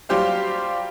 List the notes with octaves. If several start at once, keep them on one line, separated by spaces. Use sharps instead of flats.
F#3 G3 F4 G4 C5 F5